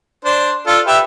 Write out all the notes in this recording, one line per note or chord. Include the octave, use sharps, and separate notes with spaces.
D4 C5
D4 F4 A4
G4 B4 E5